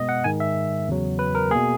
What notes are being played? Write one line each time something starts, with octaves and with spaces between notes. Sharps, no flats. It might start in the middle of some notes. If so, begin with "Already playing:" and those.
Already playing: B2 G#3 B3 D#5
F#5
G#2 D#3 G#3 G#5
E5
E2 C#3 F#3
B4
A#4
B2 A#3 G#4